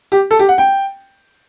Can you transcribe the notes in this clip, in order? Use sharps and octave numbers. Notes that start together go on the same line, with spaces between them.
G4
A4
G4
F#5
G5